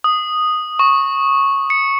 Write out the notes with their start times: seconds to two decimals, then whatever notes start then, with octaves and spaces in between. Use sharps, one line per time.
0.04 D#6
0.79 C#6
1.70 C#7